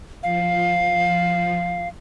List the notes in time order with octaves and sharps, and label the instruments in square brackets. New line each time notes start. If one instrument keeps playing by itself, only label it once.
[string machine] F3 [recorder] F5